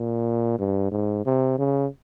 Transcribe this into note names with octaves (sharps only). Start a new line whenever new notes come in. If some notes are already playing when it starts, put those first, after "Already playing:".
Already playing: A#2
G2
G#2
C3
C#3